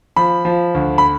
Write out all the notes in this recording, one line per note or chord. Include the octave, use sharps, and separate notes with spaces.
F3 B5
F3
D2
B5